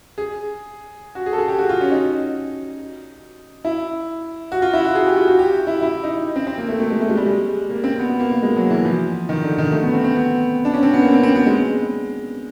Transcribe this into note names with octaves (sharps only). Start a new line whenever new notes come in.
G#4
F#4
G#4
A4
G#4
G4
F#4
F4
C#4
D#4
E4
F#4
F4
E4
F#4
G#4
G4
F4
F#4
G4
E4
E4
D#4
C4
C4
A#3
A3
A3
G#3
A3
G#3
G3
G#3
A#3
C4
B3
B3
A#3
A#3
G#3
F#3
E3
F3
D#3
D3
D#3
A3
B3
C4
C4
B3
D4
C#4
C4
B3
A#3
C4
C4
B3
G#3